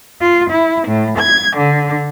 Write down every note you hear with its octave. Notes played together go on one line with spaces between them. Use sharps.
F4
E4
A2
G#6
D3